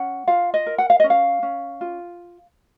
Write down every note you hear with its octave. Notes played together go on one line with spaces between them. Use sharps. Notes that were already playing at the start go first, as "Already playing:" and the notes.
Already playing: C#4 F#5
F4 F5
D#5
A#4
F#5
F5
C#4 D#5
F5
C#4
F4